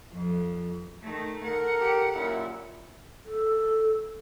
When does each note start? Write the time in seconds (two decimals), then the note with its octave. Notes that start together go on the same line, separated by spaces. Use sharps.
0.13 F2
1.02 D#3 A3
1.44 A4 A#4 F#5
1.79 G4
2.15 F#2 A#2 E4
3.26 A4